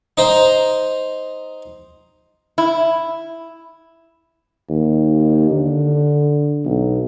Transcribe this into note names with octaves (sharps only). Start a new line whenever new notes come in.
D#4 C5 G5 A#5
E4
D#2
D3
B1